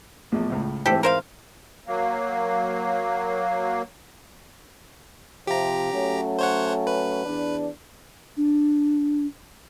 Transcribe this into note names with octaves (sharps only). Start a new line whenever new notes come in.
A#1 E2 A2
C#2 A2
G#2 E3 C4 G4 A4
A#4 C5 F5
F#3 A#3
C3 F3 G4 A#5
F#3 A3 C#4
C5 C#5 F#5
B4
E2 D4
D4